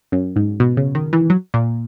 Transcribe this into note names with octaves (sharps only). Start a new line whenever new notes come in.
F#2
G#2
B2
C#3
D#3
E3
F#3
A#2